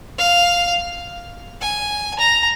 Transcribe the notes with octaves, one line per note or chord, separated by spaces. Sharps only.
F5
G#5
A#5